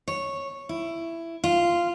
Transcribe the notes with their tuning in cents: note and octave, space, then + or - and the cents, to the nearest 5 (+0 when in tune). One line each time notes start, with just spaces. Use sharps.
C#5 -5
E4 +15
F4 -10